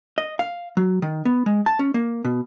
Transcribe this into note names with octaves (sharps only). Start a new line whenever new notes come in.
D#5
F5
F#3
D#3
B3
G#3
A5
C#4
A#3
B2